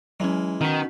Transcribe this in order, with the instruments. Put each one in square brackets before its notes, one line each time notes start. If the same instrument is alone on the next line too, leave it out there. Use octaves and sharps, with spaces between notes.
[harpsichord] E3 G#3 [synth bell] F#3 C#4
[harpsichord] B2 [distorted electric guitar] D#3 [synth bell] C#4 B6